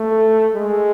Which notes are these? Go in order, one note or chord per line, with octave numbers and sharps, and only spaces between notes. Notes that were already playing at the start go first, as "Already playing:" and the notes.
Already playing: A3
G#3